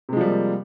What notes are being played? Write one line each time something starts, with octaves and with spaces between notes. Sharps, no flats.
C3 F3 G3 G#3 A#3